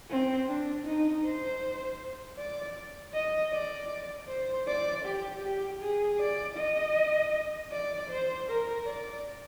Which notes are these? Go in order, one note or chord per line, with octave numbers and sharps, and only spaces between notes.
C4
D4
D#4
C5
D5
D#5
D5
C5
D5
G4
G4
G#4
D5
D#5
D5
C5
A#4
D5